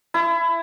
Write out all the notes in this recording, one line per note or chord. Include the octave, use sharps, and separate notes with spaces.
E4